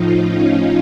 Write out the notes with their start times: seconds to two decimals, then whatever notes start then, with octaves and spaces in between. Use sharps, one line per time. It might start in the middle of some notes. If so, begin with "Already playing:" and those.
Already playing: A2 F3 D#4 F4
0.24 C#4